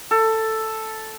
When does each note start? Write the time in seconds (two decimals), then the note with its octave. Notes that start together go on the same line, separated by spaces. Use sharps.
0.11 A4